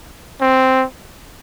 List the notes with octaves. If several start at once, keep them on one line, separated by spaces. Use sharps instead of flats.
C4